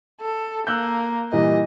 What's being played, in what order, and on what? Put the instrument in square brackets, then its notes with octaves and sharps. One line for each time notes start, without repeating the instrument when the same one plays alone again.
[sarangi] A4
[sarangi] A#3 [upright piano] E6 F#6 G6
[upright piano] A#2 E3 G3 [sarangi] D#5